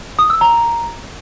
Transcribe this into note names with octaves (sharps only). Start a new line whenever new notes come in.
D#6
E6
A#5